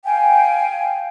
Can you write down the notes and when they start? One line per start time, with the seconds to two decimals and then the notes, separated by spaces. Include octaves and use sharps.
0.05 F5 G5 G#5